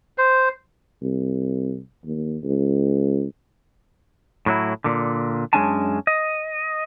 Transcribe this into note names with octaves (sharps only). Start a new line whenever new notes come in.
C5
C2
D#2
C#2
A2 F#3 E4
A#2 D3
F#2 G#3 C#4 D4 G#5 A5
D#5